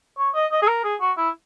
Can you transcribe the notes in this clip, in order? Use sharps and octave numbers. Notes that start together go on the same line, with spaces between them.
C#5
D#5
D#5
G#4
A#4
G#4
F#4
E4